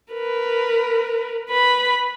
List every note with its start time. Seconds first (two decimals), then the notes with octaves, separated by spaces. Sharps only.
0.13 A#4 B4
1.50 B4 B5